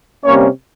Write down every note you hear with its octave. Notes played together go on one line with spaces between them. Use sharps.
C3 G3 A#3 C#4 C#5